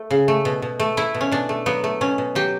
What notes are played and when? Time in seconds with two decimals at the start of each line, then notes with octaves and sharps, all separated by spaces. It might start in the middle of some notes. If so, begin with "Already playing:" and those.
Already playing: A3
0.11 C#3
0.28 A3
0.45 B2
0.62 B2
0.80 A3
0.97 A3 E4
1.15 B2
1.21 C#4
1.32 B2 D4
1.49 A3
1.66 F#3 B3
1.84 A3
2.01 B2 C#4
2.18 B2
2.35 F#3 G4